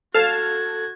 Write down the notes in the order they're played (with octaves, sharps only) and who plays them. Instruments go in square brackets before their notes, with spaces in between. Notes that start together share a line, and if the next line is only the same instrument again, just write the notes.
[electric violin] F#4 G#6 [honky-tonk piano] A4 [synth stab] F5 A5 F6